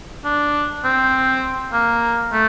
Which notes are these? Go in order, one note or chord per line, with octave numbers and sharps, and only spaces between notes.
D4
C4
A#3
A3